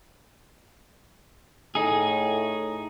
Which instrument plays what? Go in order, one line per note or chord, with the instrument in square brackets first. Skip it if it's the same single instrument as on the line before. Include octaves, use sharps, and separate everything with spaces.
[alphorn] A2 [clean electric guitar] D#4 G#4